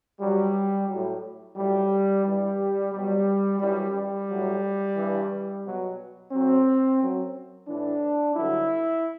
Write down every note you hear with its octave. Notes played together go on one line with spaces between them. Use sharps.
G2 F#3 G3
A2 F#3
A2 F#3 G3
G2 E3 G3
B2 F#3 G3
F#2 E3 G3
G3
A2 F#3
G2 E3
B2 F#3
A2 F#3 C4
F#2 F#3
A2 E3 D4
G2 D3 F#3 E4